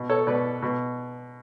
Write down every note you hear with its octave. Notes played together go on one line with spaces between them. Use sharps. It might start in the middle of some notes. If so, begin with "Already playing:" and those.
Already playing: B2
A4 C#5
B2 B4 D5
B2